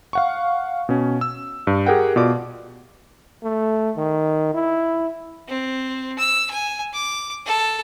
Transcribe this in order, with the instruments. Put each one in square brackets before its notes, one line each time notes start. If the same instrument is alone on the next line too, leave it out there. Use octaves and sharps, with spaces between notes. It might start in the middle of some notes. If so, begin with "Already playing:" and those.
[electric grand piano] F5 F#5 C#6
B2 C#4
E6
G2
G4 G#4 A#4 F#5 G5
B2 F4 D5 D6
[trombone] A3
D#3
E4
[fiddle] C4
E6
G#5
D6
A4